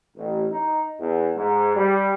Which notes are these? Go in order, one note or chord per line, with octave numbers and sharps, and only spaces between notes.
A1
D#4
E2
G#2
G3